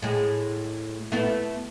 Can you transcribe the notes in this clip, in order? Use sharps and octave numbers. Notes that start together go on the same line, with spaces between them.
A2 G#3
A3 B3 E4